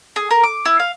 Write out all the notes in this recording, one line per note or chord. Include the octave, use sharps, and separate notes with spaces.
G#4
A#4
D6
E4
F5